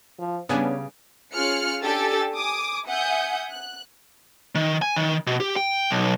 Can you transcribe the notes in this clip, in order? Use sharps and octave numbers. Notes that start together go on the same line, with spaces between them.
F3
C#3 G3 B3 C#4 D4 G#5
C#4 F4 G#4 F6 F#6 C#7
D4 G4 A4 G#5 E6 A6
G#5 D6 D#6
E5 F#5 G#5 D#6 G6
F#6
D#3
G#5
D#3
B2
G4
G5
B1